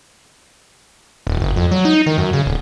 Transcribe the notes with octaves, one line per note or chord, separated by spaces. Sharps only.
D#1
F#1
F2
F#3
D#4
D#3
F#2
C#3
D1